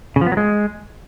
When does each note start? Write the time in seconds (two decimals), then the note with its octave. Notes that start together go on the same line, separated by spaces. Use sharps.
0.16 C#3
0.21 F3
0.27 B3
0.32 F#3
0.37 G#3